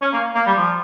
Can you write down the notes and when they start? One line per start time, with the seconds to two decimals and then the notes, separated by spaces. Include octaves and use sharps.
0.02 C#4
0.13 A#3
0.35 A#3
0.46 G3
0.57 F3